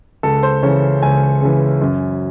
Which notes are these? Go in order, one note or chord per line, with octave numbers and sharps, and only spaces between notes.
C#2 A4
C5
C#3 E3 C#5
C#2 G#5
C#3 E3
F#2